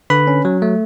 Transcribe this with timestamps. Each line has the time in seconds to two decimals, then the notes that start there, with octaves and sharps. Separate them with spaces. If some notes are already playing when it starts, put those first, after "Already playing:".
0.10 D3 B4 B5
0.27 C#4
0.45 F#3
0.62 A3